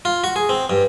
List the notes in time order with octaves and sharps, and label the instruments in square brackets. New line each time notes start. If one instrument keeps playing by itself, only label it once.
[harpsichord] F4
F#4
G#4
C4
G2